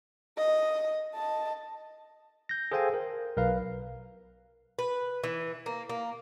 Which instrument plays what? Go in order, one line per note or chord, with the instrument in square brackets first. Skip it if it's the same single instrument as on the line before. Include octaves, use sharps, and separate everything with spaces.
[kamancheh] D#5
D#5 A5
[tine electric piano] G6 A#6
G#4 A4 C5 F5 G5 G#5
A#4
B1 A#4 B4 F5
[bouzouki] B4
E3
A#3
A#3